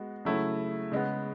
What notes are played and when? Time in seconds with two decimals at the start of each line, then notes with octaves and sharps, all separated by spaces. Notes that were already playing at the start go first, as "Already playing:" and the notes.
Already playing: G#3 B3 F#4
0.25 C#3 F#3 A3 E4
0.92 C#3 G#3 B3